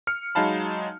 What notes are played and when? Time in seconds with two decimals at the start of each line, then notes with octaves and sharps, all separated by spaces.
0.07 F6 C#7
0.35 F#3 G#3 D#4 F5 A5 B5